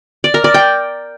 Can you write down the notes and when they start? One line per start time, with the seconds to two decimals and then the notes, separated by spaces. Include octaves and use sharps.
0.24 D5
0.34 A#4
0.44 D5
0.54 G5